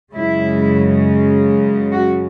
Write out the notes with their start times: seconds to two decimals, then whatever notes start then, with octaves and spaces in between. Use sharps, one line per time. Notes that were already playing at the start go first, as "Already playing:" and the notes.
0.14 F#2 C#3 G#3 E4
1.91 F#4